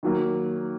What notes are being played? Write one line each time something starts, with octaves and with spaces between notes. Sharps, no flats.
D#3 F#3 A#3